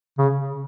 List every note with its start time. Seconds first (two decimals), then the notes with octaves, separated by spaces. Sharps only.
0.18 C#3